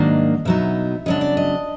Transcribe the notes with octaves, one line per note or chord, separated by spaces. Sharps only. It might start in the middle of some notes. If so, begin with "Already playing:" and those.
Already playing: G#2 D#3 F#3 A#3 D4 D#5
B2 F#3 B3 D#4 E5
C#3 F#3 B3 D4 D#5
D5
D#5